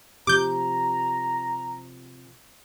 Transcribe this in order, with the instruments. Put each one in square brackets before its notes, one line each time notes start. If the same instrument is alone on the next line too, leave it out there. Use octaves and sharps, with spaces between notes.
[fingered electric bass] C3 F3 [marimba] G4 [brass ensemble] A#5 [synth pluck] D6 G6